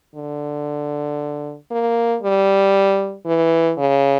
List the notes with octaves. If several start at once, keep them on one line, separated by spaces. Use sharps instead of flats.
D3
A#3
G3
E3
C#3